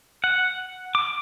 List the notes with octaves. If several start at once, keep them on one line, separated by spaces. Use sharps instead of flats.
F#5
D6